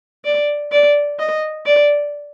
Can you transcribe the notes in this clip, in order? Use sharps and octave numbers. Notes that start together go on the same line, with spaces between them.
D5
D5
D#5
D5